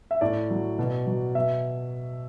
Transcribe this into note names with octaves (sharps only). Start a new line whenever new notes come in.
E5
A2 D5
F#3
B2
F#3
B2 E5